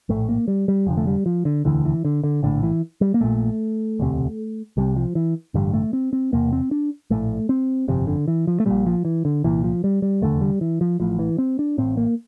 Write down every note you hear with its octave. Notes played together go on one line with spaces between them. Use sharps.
A#1 A2 A3
A#3
G3
G3
F1 F2 D3 F3
A3
G3
F3
D3
E1 D2 D3 E3
E3
D3
D3
A#1 A2 D3
E3
G3
A#3
A#1 A#2 A3
E1 D2 C3
C2 C3 G3
F3
E3
A1 G2 D3 G3
A3
C4
C4
E1 E2 C3 A#3
C4
D4
A#1 A2 A3
C4
G1 F2 C3
D3
E3
F3
A3
A#1 A#2 G3
F3
E3
D3
C2 A#2 E3
F3
G3
G3
F1 E2 D3 A3
G3
E3
F3
A1 A2 F3
E3
C4
D4
A1 A2 C4
A#3